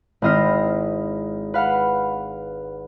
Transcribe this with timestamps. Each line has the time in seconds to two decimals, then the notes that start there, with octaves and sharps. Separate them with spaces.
0.22 G#1 C4 E4 D#5 F6 C7
1.54 B4 F5 F#5 B5